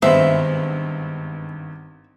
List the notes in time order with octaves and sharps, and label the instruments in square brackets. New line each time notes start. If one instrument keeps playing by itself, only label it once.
[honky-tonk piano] G#1 G2 [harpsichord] E3 G#3 B3 [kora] C5 [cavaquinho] E5